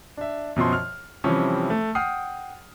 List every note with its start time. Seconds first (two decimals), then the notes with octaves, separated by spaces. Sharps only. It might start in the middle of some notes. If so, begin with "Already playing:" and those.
0.17 D4 E5
0.56 F#2 B2 F3 C6
0.73 F6
1.24 C3 E3 F3 G3 C#4
1.70 A3
1.95 F#5 G5 D#6 F6 C7